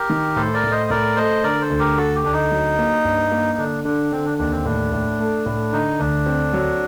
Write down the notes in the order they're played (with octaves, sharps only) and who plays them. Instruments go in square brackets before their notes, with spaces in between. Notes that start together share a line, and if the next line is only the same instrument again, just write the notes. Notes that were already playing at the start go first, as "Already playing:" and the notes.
Already playing: [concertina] G4 A#4
[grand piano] D#3
[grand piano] A2 [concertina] A4 C5
[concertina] A#4 D5
[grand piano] A2
[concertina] C5 D#5
[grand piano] A2 [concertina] A#4 D5
[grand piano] A3 [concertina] C5 D#5
[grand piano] D3 [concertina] A#4 D5
[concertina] A4 C5
[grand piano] D2
[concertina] G4 A#4
[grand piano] A3 [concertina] F#4 A4
[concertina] G4
[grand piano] D2 [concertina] D4
[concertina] D#4
[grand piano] F#3
A#3
G2
A#3
[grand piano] D3 [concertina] D4
[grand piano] D3 [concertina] D4
[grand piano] D3 [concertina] C4
[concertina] D4
[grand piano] D#2 [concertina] D4
[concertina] C4
[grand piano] A2 [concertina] D4
[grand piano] A2
A3
A2
[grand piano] D3 [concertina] D#4
[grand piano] D2 [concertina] D4
[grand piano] C4
F#3